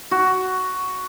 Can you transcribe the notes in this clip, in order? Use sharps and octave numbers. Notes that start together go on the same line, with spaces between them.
F#4